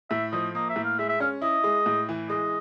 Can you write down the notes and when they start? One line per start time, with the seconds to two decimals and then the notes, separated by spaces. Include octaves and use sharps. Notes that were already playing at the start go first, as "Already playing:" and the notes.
0.10 A2 E5
0.32 F3 D#5
0.55 A#3 D#5
0.70 E5
0.76 A2
0.84 F5
0.99 G#3 E5
1.09 E5
1.20 C#4 F5
1.42 E4 D#5
1.64 G#3
1.86 A2
2.09 E3
2.29 G#3 D#5